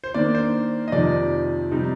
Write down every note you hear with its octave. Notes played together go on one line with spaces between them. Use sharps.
C5
D#3 A#3 D4 D5
C5
D#5
F2 C3 D#3 D5
C3 G3 C4 D#4